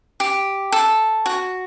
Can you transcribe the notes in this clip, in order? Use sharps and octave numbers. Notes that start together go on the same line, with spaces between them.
G4
A4
F#4